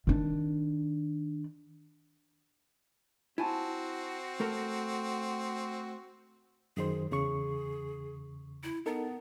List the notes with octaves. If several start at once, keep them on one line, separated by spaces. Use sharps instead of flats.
D#3 D4
C4 E4 F#4 G#5 A5
A3 A4 A#4
F#2 D#3 G#4 C5
E2 C#3 G#4 C#6
E4
B3 D#4 A4 A#4